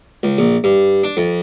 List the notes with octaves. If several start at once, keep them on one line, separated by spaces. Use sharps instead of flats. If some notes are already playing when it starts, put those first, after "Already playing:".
C#2
A#1
G2
D4
F2